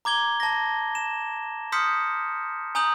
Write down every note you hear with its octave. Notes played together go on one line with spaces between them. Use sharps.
A#5 D6 G#6 G7
A5 A#6
E7
C6 D#6 F6 G6 B6 C#7
G#5 A#5 D#6 G6 F#7